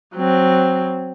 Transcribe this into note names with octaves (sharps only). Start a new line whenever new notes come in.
F#3 C4